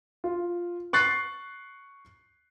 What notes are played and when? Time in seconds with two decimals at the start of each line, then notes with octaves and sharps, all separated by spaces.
0.24 F4
0.93 C#6 F#6 A6 C7